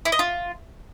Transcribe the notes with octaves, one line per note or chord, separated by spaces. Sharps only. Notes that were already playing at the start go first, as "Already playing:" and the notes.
E4
D#5
F4